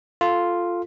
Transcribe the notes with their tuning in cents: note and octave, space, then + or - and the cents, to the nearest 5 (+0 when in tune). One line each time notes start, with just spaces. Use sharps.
F4 +0 A4 +0